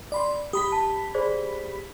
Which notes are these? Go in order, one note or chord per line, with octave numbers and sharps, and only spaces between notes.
D5 B5 C6
G4 B5 D#6 B6
A5
G#4 C5 D5